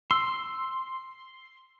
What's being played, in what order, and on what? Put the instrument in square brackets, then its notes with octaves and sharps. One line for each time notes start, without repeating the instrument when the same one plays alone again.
[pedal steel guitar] C6 [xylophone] E6